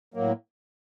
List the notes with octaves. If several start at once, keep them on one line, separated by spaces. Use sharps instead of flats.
A2 F#3 A#3